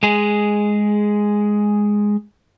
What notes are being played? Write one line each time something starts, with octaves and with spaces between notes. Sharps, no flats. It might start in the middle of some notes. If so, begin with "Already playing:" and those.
G#3 G#4